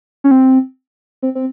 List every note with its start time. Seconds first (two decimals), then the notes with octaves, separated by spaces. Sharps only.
0.24 C#4
0.31 C4
1.22 C4
1.35 C4